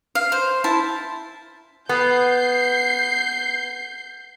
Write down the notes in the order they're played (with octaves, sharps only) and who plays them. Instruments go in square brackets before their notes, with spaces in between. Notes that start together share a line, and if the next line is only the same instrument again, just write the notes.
[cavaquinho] F5
C5
E4 A5 C6
[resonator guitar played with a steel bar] B3 [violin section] G6 C7